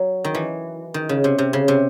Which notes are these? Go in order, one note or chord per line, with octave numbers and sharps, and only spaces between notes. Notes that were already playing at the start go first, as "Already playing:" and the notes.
Already playing: F#3
D#3
E3
D#3
C#3
C3
C3
C#3
C3